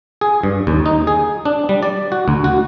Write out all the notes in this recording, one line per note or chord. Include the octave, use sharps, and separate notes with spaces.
G#4
G2
D#2
D#4
G#4
D4
G3
D5
F#4
D2
F#4